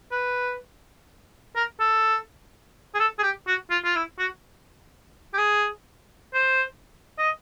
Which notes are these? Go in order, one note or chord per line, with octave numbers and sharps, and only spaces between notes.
B4
A#4
A4
G#4
A4
G#4
G4
F#4
F4
F4
E4
F#4
G4
G#4
C5
D#5